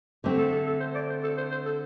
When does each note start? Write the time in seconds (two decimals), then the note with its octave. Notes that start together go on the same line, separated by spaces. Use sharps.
0.24 D3 A3 C4 G4
0.38 A4
0.52 A4
0.66 A4
0.80 C5
0.95 D5
1.10 C5
1.23 A4
1.37 C5
1.51 C5
1.65 A4